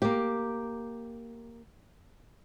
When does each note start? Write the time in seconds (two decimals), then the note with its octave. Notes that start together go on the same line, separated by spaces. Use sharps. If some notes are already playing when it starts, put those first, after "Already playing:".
0.02 A#3 G4